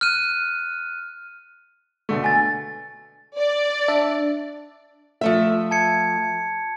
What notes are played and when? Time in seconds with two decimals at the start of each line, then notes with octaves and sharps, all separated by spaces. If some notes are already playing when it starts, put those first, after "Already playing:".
0.01 F6 F#6 D#7
2.09 B2 D3 A3
2.24 G#5 A6
3.36 D5
3.88 D4 E5
5.21 F3 A3 E5
5.71 A5 G#6 C#7